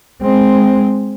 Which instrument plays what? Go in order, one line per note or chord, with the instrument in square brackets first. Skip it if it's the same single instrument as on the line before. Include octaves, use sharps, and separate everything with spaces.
[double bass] G#3 C4